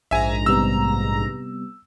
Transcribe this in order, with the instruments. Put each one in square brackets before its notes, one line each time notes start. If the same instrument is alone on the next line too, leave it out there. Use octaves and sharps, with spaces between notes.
[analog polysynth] A#1 G#2 A#5 [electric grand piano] E5 G#5
[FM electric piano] C3 G3 B3 [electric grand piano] E6